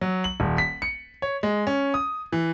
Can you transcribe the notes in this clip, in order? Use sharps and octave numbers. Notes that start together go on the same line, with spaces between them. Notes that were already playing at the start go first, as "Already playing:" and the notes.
F#3
F#7
D#1
B6
C#7
C#5
G#3
C#4
D#6
E3